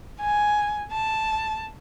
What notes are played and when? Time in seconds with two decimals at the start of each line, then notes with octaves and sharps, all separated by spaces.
0.20 G#5
0.92 A5